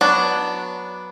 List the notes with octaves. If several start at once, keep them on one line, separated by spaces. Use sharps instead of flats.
F#3 B3 D4